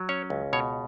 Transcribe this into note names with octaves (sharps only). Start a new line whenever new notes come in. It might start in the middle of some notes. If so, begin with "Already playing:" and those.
Already playing: F#3
C#4 C#5
C#2
B2 C#5